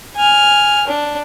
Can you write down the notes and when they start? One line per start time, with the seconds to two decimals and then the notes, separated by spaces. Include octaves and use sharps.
0.16 G#5 F6
0.87 D4